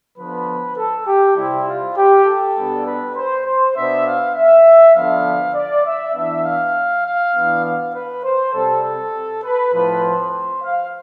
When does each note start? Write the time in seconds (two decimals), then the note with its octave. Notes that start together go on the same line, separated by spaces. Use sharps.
0.17 D3 F3 B3 B4
0.76 A4
1.06 G4
1.37 C3 G3 C4 E4
1.67 F4
1.97 G4
2.25 A4
2.56 B2 G3 B3 D4
2.85 B4
3.15 C5
3.45 C5
3.75 B2 B3 D4 E5
4.06 F5
4.35 E5
4.95 D3 F3 B3 D4 F5
5.54 D5
5.85 E5
6.14 E3 B3 D4 E5
6.44 F5
7.05 F5
7.34 E3 B3 D4
7.64 F5
7.94 B4
8.24 C5
8.53 C3 G3 C4 A4
8.83 A4
9.44 B4
9.73 A2 F3 C4 B4
10.03 C5
10.62 F5